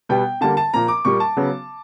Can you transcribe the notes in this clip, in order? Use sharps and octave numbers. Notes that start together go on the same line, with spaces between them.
B2 G3 B3 G5
D3 G3 A#3 A5
A5
A#2 F3 A#3 A#5
D6
A#2 G3 A#3 C#6
A5
C#3 F#3 B3